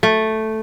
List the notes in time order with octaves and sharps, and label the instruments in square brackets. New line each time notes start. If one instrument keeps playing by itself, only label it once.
[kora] A3